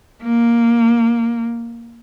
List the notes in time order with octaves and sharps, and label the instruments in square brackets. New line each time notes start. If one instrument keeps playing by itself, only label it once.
[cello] A#3